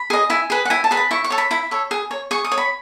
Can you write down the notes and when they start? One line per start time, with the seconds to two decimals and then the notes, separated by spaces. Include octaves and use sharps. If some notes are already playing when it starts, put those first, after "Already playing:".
Already playing: B5
0.10 G#4 D#5
0.30 E4 G#5
0.50 G#4 B4
0.65 F#5
0.70 E4 G#5
0.84 A5
0.91 G#4 B4
0.97 B5
1.11 E4 C#6
1.24 C#6
1.30 A4 C#5
1.38 B5
1.51 E4 B5
1.71 A4 C#5
1.91 G#4
2.11 C#5
2.31 G#4 C#6
2.44 D#6
2.52 C#5
2.58 B5